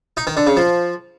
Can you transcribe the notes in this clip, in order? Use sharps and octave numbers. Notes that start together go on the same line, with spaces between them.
D#4
D#3
D3
C#3
F3